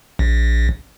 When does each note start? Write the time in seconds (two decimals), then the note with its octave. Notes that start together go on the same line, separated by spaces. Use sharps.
0.19 A#1